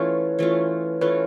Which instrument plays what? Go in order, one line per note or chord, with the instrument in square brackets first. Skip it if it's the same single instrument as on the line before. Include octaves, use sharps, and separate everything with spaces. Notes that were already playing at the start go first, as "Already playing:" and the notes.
Already playing: [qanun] E3 A3 C#4 F4 [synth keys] B4 C#5
[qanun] E3 A3 C#4 F4
[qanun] E3 A3 C#4 F4 [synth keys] B4 C#5